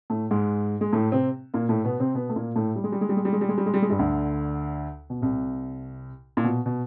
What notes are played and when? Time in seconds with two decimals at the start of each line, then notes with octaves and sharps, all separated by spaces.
0.10 A2 A3
0.31 G#2 G#3
0.81 G#3
0.92 A2 A3
1.12 C3 C4
1.54 A#2 A#3
1.69 A2 A3
1.85 B2 B3
2.00 C3 C4
2.15 B2 B3
2.30 A3
2.36 A#2 A#3
2.56 A2 A3
2.76 G3
2.84 G#3
2.92 G3
3.01 G#3
3.09 G3
3.17 G#3
3.25 G3
3.33 G#3
3.41 G3
3.49 G#3
3.58 G3
3.66 G#3
3.74 G3
3.82 G#3
3.89 G2 G3
3.99 D2 D3
5.10 B2
5.21 C2 C3
6.37 A#2
6.44 B2
6.66 B2